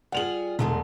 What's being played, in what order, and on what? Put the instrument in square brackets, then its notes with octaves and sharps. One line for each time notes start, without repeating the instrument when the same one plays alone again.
[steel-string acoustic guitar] G3 F4 G#4 [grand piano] F#5 F7 F#7
[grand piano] E1 [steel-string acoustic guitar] D3 G#3 A3